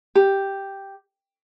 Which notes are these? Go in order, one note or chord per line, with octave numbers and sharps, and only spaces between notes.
G4